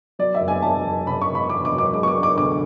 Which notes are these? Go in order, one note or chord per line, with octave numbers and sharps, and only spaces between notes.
F#3 D5
E5
F#1
G#5
F#3 A5
F#1
C#3 B5
C#6
C#3
B5
E2 D6
D6
F#3
D6
G#3 D6
C#6
D6
D4
D6
D2 D6